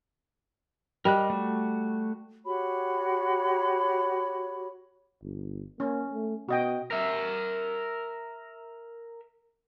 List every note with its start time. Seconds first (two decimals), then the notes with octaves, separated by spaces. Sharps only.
1.05 G3 A#4 D#5 F#6
1.30 A3 F#4
2.44 F#4 G4 C#5 B5
5.23 G1
5.80 A#3 C#4
6.12 A3
6.49 B2 F#4 D#5 G5
6.91 A#4 E5